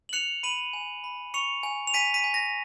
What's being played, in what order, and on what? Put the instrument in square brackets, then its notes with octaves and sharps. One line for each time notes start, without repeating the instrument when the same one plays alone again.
[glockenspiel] F#7
F#6 C#7 F7
B5 D#7 F#7
G#5
B5
C#6 C#7 F7
G#5
F7
G#5 B6 D#7
B6 D#7
G#5
A#6